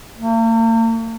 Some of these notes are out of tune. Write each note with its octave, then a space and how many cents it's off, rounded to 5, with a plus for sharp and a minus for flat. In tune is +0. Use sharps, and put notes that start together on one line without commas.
A#3 -45